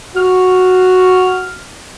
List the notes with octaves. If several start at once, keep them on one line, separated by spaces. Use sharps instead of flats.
F#4 F6